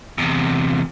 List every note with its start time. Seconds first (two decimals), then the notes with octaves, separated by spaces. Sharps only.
0.18 E2 C3